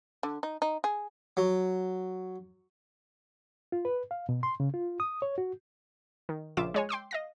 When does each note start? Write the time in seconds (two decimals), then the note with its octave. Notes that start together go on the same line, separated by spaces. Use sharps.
0.23 D3
0.43 D#4
0.62 D#4
0.84 G#4
1.37 F#3
3.72 F4
3.85 B4
4.11 F5
4.29 B2
4.43 C6
4.60 C#3
4.74 F4
5.00 D#6
5.22 C#5
5.38 F#4
6.29 D#3
6.57 A#1 C#3 F4 E5 D6 E7
6.74 G#3 C#5 G#5
6.89 G5 C6 D6 E6
7.11 D#5 F5 A#6